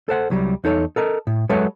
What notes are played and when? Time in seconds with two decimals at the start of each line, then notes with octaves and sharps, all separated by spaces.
0.09 A4 C5 F#5
0.30 C2 F#3 G3
0.64 E2 D#4 A4 C#5
0.96 A4 A#4 D#5
1.27 A2
1.49 F#3 G#3 A4 B4 C#5 E5